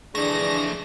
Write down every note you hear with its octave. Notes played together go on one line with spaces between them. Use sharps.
F2 D3 E3 A3 D4 G#4 A#6